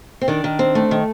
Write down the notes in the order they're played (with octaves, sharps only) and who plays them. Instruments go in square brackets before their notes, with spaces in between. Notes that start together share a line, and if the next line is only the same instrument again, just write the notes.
[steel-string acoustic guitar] C4
D#3 D4
D#3
C4
A3
D#3